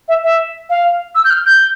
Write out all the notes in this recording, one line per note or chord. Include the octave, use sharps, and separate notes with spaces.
E5
E5
F5
E6
G6
F6
G6